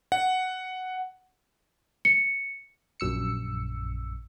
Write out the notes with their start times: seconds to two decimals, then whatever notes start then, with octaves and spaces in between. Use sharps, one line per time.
0.12 F#5
2.05 C#7
3.00 A#1 F#2 E6 C#7